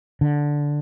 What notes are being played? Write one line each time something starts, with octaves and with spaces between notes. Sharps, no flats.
D3